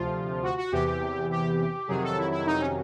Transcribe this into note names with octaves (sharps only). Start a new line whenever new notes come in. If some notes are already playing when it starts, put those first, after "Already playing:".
Already playing: D2 C3 F3 F4
F#4
F#4
E2 C3 E3 G4
G4
F2 C3 D#3 F#3 G#4
A4
E4
E4
D#4
C#4